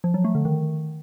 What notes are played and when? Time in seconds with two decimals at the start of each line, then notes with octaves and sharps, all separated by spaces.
0.04 F3
0.14 F#3
0.24 A3
0.35 D3
0.45 D#3